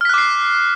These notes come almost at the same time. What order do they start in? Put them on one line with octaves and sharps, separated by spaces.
F6 B6 F#6 D6 C7